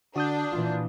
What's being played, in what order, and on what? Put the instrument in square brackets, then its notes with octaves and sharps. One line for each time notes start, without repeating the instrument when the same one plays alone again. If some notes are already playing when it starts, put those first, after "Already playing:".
[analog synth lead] D3 [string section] D4 [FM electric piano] F#4 D#6 G6
[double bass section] A#2 E3 [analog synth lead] F4